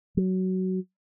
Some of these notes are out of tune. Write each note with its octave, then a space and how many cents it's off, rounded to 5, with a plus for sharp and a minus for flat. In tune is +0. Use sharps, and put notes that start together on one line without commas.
F#3 +15